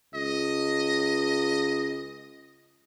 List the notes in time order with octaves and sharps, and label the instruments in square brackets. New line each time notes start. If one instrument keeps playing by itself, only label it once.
[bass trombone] C#2 [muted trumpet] D#5